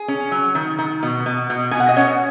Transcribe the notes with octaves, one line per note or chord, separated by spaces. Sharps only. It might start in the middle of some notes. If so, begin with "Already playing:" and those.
Already playing: G#4
C#4
F#3
D#3
D#3
B2
B2
B2
B2 G#5
F#5
D#5
C#4 C#5